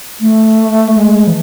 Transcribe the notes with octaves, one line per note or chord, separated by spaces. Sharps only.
A3
G#3
E3